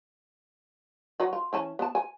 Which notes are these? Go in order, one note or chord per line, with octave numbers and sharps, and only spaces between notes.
F#3 F#4
F4
E3 C#4 A5
B3 A5
G#5